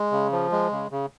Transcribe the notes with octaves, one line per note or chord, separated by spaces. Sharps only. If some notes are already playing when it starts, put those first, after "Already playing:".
Already playing: G#3
C#3
F3
G#3
C#3
C#3